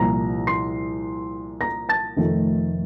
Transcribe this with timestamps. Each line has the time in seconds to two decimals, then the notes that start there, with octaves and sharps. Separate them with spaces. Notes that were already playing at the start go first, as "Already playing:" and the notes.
Already playing: C2 A#2 F3 A#5 A#6
0.47 C6 C7
1.61 A#5 A#6
1.89 A5 A6
2.17 F1 F2 D#3 A3